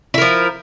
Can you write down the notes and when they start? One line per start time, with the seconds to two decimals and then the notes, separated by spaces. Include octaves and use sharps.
0.14 E4
0.18 A#4
0.21 F3